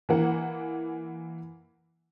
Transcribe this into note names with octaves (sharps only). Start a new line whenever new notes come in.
E3 A#3 F#5